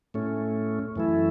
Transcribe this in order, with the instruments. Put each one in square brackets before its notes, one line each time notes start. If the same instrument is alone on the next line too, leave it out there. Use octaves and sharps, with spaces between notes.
[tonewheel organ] A2 A3 C#4
F#2 E3 A3 E4